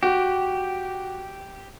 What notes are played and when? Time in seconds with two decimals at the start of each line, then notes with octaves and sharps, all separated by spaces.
0.03 F#4 G4